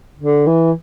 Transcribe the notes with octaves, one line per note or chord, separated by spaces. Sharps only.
D3
E3